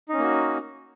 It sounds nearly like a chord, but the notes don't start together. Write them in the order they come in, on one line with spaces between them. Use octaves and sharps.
D#4 C#4 A#3 F#4